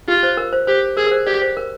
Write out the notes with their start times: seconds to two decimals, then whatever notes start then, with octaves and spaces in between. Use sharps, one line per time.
0.08 F4 G4
0.23 C5
0.37 A#4
0.53 C5
0.67 G4 C5
0.97 G#4 A#4
1.07 A#4
1.11 C5
1.26 G4 D5
1.42 C5
1.57 A#4